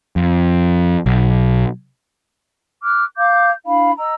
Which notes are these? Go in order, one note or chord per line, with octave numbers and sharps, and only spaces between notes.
F2
B1
D6 F6 F#6
F5 D6 G6
D4 E4 F5 B5
D#5 A#5 E6